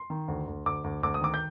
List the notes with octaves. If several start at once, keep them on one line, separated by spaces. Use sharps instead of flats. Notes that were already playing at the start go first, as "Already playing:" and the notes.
Already playing: C6
D#3
D2
D2
D2 D6
D2
D2 D6
D#6
D#3 D6
G6